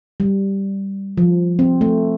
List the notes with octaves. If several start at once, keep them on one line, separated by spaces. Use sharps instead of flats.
G3
F3
C4
A3